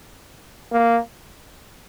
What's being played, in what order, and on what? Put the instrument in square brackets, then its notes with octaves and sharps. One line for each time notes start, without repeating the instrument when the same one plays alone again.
[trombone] A#3